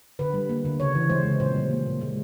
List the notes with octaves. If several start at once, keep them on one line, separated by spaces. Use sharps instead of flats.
D3 B4
G3
A#3
D3
C#3 C#5
E3
G#3 C5
C#3
A#2 C5
G3
A#3
A#2
G#3